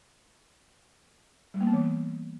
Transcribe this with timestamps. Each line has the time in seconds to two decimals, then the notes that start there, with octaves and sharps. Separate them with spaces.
1.54 G3
1.61 A#3
1.67 B3
1.73 E3